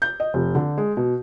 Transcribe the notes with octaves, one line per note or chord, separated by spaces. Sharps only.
G6
D#5
F1
D3
G#3
B2